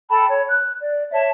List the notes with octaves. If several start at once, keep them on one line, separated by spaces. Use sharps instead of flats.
A4 G5 A5 B5
C#5
F#6
D5
C#5 E5 A5